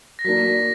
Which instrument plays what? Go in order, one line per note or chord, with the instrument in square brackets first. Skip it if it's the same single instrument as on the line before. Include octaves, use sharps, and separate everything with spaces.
[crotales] A#6
[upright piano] F#3 A#3 D4 [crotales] B6